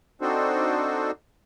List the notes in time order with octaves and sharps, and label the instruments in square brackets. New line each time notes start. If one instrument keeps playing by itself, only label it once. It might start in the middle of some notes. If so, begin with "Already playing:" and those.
[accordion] C4 D4 D#4 F#4 A4 C5